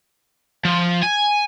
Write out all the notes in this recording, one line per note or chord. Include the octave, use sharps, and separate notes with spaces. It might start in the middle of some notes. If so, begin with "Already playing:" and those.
F3
G#5